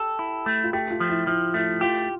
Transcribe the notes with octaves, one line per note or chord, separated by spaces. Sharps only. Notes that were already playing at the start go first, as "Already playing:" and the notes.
Already playing: G4 A4
E4
A3
F4
A3 G4
F4
F3
E4
F3 E4
A3 E4
F4 G4